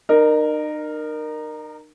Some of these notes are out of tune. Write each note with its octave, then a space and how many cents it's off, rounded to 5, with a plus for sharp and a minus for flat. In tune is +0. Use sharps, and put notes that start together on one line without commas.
D#4 -40 A#4 +0